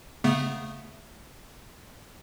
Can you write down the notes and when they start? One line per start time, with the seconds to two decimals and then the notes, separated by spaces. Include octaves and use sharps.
0.24 C#3 A3 B3